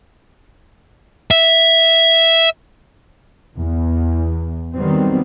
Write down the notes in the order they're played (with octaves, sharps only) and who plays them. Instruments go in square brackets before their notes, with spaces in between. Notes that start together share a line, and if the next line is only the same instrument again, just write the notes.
[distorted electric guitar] E5
[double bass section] E2
D#3 F#3 G3 B3 C4